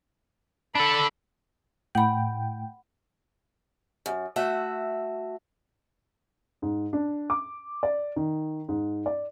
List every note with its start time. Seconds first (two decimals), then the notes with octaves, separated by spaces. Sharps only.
0.75 D4 A4 B5
1.95 A2 F#5 G5 B5
4.06 F#2
4.36 A3 F#4 E5
6.62 G#2
6.93 D4
7.30 D6
7.83 D5
8.16 D#3
8.69 G#2
9.06 D5